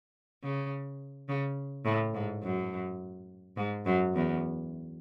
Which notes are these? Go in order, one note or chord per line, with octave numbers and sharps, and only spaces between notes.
C#3
C#3
A2
G#2
F#2
G#2
F#2
E2